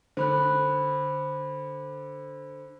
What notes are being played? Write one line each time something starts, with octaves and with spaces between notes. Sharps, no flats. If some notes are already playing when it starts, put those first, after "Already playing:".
D3 C5 B5 F#6